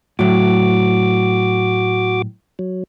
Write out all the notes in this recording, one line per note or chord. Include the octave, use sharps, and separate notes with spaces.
A2 F#3 F#4 D6
F#3